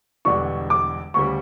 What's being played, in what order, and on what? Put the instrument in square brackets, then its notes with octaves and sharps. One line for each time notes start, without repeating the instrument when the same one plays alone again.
[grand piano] E1 E2 D3 G3 D4 [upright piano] C#6
[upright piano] D6
[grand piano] D2 C#3 G3 [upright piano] C#6